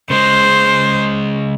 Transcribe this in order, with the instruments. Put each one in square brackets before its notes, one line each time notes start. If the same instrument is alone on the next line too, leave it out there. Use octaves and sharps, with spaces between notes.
[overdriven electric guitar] C#3 G#3 [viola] C5